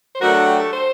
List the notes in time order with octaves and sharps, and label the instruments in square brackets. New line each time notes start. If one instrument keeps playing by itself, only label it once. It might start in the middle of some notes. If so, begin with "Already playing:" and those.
[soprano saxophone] C5
[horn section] F#3 A3 D4 F#4 [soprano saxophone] A#4
[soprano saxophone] A4
G4
A4
C5